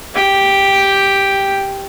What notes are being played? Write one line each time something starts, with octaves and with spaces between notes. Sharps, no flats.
G4 G5